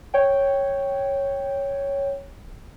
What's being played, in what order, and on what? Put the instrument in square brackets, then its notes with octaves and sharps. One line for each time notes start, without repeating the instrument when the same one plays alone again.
[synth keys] C#5 G5